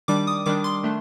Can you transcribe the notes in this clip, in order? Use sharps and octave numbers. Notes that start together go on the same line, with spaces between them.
D#3 G3 D4 D6
D#6
D#3 G3 D4 D6
C6
D#3 A3 D4